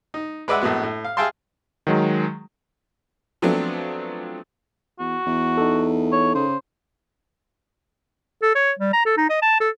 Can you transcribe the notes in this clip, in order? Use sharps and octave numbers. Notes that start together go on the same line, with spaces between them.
D#4
G#3 B4 D5 E5 F#5
A#1 A2 B3 F#4
A2
F5
G#4 E5 F5 G5 A5 C6
D#3 F#3 G#3
F3 F#3 A3 B3 C4 D4
E2 F#4
E2
D#4 A4
C#5
C#3 C5
A4
C#5
G3
A#5
A4
D#4
D#5
A5
A4